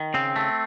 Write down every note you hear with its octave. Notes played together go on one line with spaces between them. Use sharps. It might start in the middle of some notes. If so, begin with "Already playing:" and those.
Already playing: D#3
C#3 C4
A3